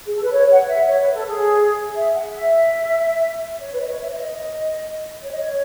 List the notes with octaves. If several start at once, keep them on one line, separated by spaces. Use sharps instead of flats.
G#4
A4
B4
C#5
F#5
E5
C#5
B4
A4
G#4
E5
F#5
E5
C#5
B4
D#5
C#5
E5
C#5
D#5
C#5
D#5
C#5